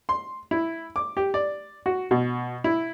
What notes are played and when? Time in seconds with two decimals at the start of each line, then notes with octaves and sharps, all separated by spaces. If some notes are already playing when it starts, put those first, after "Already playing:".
0.09 C6
0.51 E4
0.96 D6
1.17 G4
1.34 D5
1.86 F#4
2.11 B2
2.64 E4